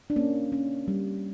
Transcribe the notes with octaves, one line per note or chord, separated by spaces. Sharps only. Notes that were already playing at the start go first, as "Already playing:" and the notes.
D4
A#3 C#4
C#4
G3